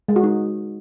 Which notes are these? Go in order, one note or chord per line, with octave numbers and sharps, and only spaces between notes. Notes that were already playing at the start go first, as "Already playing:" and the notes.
G#3
F#4
D#4